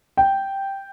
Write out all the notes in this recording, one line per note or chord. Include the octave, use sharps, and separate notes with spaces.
G5